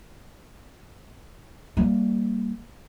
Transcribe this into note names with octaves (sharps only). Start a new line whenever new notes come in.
G3 A#3